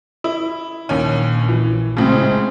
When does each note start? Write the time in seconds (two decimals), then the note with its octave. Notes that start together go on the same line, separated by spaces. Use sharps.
0.24 E4
0.89 A#1 D#2 C#4
1.49 E3
1.97 A2 C#3 G#3 C4